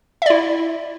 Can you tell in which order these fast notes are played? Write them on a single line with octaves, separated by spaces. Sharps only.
E5 D5 E4